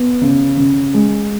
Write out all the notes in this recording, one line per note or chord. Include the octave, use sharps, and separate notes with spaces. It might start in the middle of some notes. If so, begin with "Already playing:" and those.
Already playing: B3
C#3
C#3
G#3